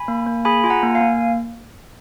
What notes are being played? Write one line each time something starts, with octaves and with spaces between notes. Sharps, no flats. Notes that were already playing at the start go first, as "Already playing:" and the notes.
Already playing: G#5 B5
A#3
A#3
G#4 G#5 B5
F4 G#5
F#5 A#5
A#3
F5 G#5
A#3